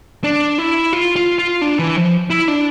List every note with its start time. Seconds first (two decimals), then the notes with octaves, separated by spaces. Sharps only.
0.24 D4
0.58 E4
0.93 F4
1.16 F4
1.39 F4
1.61 D4
1.79 E3
1.96 F3
2.30 E4
2.48 D4